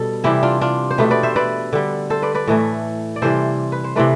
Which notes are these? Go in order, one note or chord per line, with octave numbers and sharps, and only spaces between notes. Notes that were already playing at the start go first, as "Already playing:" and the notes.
Already playing: B2 G3 A4
C3 E3 G3 E4 G4
D4 F4
D4 F4
C5
B2 A3 G4 B4
B4 D5
C5 E5
B4 D5
D3 G3
A4 C5
B4 D5
B4 D5
A2 E3 A3
D5
C3 E3 G3 A4 C5
B4
C5
C3 E3 A3 B4 D5